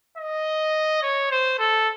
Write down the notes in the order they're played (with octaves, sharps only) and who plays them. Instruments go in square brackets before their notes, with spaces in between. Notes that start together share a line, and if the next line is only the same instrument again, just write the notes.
[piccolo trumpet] D#5
C#5
C5
A4